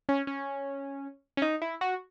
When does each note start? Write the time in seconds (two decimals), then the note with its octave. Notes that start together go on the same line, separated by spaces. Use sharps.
0.09 C#4
0.27 C#4
1.37 C#4
1.42 D#4
1.62 E4
1.81 F#4